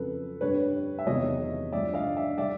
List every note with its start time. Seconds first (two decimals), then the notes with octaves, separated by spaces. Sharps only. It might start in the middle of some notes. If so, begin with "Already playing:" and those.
Already playing: F2 C#3 F#3 A4 B4
0.41 G2 D3 G3 B4 C#5
0.99 E5
1.07 E2 C3 D#3 F#3 C#5 D#5
1.72 G2 D3 F3 D5 E5
1.94 D#5 F5
2.16 D5 E5
2.38 D#3 G3 D5 E5